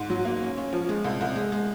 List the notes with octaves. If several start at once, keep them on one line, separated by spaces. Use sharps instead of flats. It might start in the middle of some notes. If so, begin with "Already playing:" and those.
Already playing: G#2
F#3
A#3
C#4
C#4
F3
G#3
C2
C2
G#3
G#3